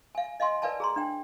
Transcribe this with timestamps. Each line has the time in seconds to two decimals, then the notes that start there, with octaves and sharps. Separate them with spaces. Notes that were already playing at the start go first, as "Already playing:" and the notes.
0.15 F5 G#5
0.40 D#5 F5 G#5 C6
0.62 A#4 B4 D5 F5 G#5 A5
0.80 G#4 A#5 C6
0.96 D4 G5